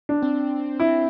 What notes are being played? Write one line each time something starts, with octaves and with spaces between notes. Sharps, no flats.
D4
C4
E4